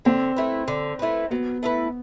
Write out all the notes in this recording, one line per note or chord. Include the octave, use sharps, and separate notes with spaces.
D3 C4
A3 E4 B4
D3
A3 E4 B4
F#3 B3
A3 E4 B4